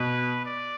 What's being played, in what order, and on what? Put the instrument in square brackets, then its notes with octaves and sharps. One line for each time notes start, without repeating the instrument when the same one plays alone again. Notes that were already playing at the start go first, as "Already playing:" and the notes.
Already playing: [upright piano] B2 [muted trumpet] B4
[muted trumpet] D5